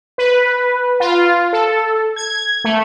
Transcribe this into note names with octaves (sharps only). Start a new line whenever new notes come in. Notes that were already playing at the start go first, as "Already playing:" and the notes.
B4
F4
A4
G#6
A3